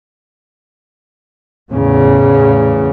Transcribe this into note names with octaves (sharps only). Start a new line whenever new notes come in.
E2 A2 C#3